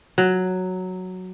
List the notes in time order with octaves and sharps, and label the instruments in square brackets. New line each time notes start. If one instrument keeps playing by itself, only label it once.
[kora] F#3